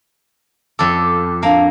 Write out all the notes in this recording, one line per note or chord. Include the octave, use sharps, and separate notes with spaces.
F2 A4 D6
A#3 D4 F5 A5